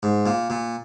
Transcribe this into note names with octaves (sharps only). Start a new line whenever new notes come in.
G#2
A#2
A#2